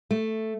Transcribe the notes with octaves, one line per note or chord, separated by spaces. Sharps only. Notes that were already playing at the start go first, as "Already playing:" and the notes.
A3